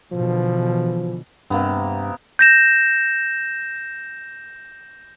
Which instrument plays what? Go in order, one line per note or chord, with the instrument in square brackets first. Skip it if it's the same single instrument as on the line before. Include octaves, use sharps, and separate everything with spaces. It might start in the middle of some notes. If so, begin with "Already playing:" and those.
[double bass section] B2 D3 E3 [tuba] F3
[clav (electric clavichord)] G2 [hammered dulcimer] C3 A#3 B3
[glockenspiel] G6 A#6 E7